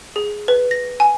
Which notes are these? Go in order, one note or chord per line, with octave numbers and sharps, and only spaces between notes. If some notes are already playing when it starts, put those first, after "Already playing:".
G#4
B4
A#6
G#5